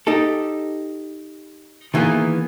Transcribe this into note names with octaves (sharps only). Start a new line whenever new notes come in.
D#4 G4 A4
D#3 E3 A#3 B3 G#4